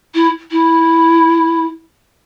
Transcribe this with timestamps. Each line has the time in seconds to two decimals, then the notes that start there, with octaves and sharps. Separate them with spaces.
0.14 E4
0.51 E4